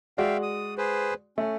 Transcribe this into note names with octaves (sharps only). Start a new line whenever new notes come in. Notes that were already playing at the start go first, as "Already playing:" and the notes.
G#3 F#4 D5 E5 F5 G5
D#6
G#4 B4 C5
A3 C#4